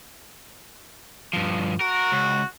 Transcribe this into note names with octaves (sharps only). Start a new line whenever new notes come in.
G2 F3
F#4 A#4
C#2